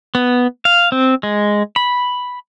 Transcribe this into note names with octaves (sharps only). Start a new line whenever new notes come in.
B3
F5
C4
G#3
B5